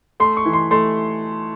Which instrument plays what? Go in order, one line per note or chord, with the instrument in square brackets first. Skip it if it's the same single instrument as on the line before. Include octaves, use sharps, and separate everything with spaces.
[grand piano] A3 C6
C#6
E3
C6
A3 C6